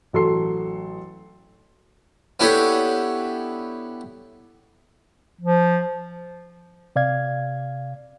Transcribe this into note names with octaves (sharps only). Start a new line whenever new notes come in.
A1 F#3 A4 C6 C7
B3 D4 E4 G4 A4 C#5
F3
C3 D5 F5 G#6